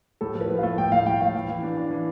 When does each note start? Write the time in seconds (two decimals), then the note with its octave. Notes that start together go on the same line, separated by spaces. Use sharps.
0.21 A2 A4
0.35 F3
0.41 B4
0.50 F3
0.58 A3 F5
0.78 A2 G5
0.92 A2 F5
1.06 A2 G5
1.20 A2 F5
1.35 E3
1.49 E3
1.63 D4
1.77 D4
1.91 E3